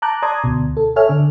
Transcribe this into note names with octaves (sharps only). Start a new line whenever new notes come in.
A5 A#5 D6 F#6 G6
D5 A5 A#5 C6 D#6 G#6
D2 B2
A4
A4 C#5 E5 G#5 F6
D3 D4